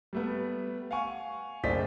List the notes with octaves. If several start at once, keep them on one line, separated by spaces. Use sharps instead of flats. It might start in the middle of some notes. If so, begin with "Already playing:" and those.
G3 A3 B3
F5 F#5 G#5 C#6
F#1 A3 C5 D5 D#5 B6